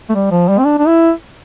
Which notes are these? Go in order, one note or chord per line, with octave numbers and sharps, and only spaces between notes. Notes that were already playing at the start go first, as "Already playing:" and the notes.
A3
G3
F3
G3
C4
D4
D4
E4